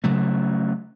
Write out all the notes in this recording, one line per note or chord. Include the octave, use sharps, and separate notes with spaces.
C#3 F#3 A3